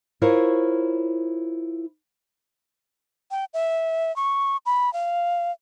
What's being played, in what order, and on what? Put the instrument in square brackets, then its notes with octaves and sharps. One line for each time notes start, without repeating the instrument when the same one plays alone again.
[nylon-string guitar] E4 F4 A#4 C5 C#5
[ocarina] G5
E5
C#6
B5
F5